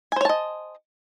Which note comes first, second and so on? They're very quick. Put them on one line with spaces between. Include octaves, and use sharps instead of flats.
G#5 C5 C#5 A5 D#5